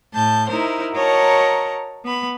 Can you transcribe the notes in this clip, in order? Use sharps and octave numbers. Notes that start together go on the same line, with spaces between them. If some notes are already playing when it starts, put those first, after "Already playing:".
A2 A5 G6
D#4 E4 A#4 C5
F#4 A#4 C#5 D#5 A5 A#5
B3 B5